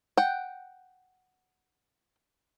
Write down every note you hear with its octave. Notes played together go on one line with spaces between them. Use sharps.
F#5 G5